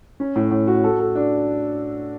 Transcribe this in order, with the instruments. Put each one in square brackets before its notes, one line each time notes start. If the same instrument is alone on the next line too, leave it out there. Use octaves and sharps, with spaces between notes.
[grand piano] C#4
A2
A2
F#4
A4
A4
D4